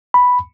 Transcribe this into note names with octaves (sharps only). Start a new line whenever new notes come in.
B5